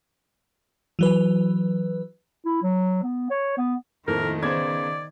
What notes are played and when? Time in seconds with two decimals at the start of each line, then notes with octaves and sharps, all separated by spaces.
0.99 E3 F#3 B4
2.45 E4
2.62 F#3
3.03 B3
3.30 C#5
3.57 B3
4.08 F2 A2 D#3 A#3 A#4
4.43 C#3 B3 C5 D5 G#6